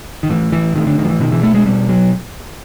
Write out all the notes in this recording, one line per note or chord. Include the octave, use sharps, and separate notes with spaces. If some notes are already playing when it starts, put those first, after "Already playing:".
D#3
A2 E3
E3
A2 D#3
D3
D#3
F3
E3
B2 D#3
E3
A3
G#3
B2 G3
F#3